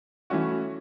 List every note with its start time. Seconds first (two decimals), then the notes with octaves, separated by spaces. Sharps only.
0.30 E3 A3 C#4 F#4